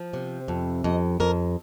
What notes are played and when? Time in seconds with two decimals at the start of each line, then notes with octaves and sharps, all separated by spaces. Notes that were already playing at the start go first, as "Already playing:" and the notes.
Already playing: F3
0.13 C3
0.48 F2
0.84 F2 D#5
1.20 F2 A#4